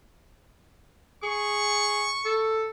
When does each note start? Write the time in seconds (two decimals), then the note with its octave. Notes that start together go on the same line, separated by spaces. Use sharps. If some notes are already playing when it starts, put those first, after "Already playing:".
1.23 G#4 C#6
2.25 A4